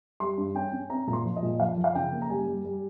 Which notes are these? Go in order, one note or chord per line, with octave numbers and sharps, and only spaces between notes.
G3 C6
G2
C#4 G5
C#4
C4 A#5
A#2 A#5
C6
F3
D#5
A#2
F3 F5
F3
F5
C#3 G5
A#3
A#5
G3 G#5
G3
G3